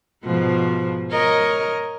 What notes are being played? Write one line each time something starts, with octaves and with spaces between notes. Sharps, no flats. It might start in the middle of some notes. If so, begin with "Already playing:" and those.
G#2 B2 F3
A#4 C#5 D#5